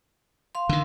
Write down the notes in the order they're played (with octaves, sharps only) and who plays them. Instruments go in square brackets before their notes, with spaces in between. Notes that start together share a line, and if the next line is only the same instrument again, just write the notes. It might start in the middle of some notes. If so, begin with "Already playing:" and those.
[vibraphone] F5 C6
[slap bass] D3 D#3